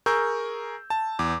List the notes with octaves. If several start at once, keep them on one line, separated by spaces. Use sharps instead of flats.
G#4 A#4 C#6 E6 G6
A5
E2 D6